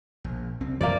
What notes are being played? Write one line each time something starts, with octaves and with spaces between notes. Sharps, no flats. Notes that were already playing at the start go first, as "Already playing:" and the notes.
A#1
C2 C4
F#2 F3 A#3 D5